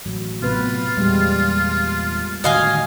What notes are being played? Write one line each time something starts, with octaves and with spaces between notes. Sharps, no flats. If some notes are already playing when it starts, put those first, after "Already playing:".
A1 F#3
A2 C3 F#3 B3 F4 B4
E2 A#2 G3 G#3 G4
A2 D3 D#3 F#4 D#5 F5 G#5